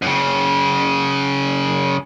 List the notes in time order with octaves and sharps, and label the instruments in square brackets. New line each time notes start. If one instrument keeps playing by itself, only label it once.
[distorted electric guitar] F#2 C#3